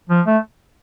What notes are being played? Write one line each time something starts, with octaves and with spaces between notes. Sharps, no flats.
F3
A3